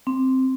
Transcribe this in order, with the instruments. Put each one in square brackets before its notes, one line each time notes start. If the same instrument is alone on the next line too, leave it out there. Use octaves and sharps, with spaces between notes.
[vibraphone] C4